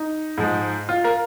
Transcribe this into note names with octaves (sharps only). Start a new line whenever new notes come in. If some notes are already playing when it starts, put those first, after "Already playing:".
Already playing: D#4
G#2 F3 G#3
F4
A#4